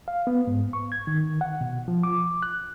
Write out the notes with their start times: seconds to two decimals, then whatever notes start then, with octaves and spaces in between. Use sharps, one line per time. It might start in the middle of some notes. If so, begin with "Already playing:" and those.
0.08 F5
0.27 B3
0.47 G#2
0.73 C#6
0.92 G#6
1.07 D#3
1.41 F#5
1.61 B2
1.88 F3
2.03 D6
2.43 F#6